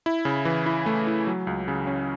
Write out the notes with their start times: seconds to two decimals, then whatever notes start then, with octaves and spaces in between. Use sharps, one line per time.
0.06 E4
0.25 C#3
0.45 E3
0.66 E4
0.86 A3
1.07 E4
1.27 F#3
1.47 C#2
1.68 C#3
1.87 C#4